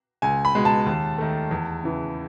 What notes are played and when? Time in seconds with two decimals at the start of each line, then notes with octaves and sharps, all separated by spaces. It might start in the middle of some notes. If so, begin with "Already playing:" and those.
0.22 C#2 G#5
0.45 B5
0.55 B2 G#3
0.65 A5
0.86 D#2
1.18 D#3 A3
1.51 E2
1.83 C#3 E3